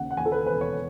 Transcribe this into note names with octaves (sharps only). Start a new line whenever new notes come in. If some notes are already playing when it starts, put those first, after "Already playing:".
Already playing: D#2 C#3 F#5
F#5
D#2 G#5
A4
B4
E1 B4
C#5